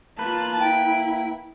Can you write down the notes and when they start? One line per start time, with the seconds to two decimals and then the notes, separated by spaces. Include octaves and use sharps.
0.19 A#3 F4 B4 A5
0.60 E4 G5